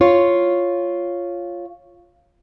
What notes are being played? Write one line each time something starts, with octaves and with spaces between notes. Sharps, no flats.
F4 C#5